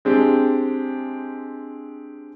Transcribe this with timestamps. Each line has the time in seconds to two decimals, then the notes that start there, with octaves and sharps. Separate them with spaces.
0.05 G#3 C4 D4 G4